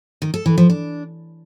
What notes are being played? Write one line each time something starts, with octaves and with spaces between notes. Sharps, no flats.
D#3
A4
E3
F3
D4